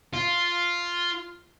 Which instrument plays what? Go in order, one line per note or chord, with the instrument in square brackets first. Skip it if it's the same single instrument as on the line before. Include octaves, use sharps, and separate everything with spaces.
[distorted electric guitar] F4